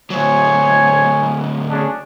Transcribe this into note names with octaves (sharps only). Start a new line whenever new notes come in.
D2 F#3 C5 C#5 G#5
C#4 D4 G#4